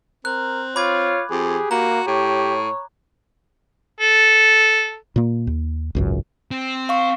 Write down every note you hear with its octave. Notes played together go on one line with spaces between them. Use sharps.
C4 A#4 F#6
F4 C#5 B5 D6 G#6
F2 G4 G#4
A#3 F#4 A#5
A2 G4 C#5
A4
A#2 A#3
D#2
G#1 C#2 F#2
C4
F5 C#6